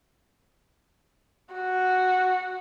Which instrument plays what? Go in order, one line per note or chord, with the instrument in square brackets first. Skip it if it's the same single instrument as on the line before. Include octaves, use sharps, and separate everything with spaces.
[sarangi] F#4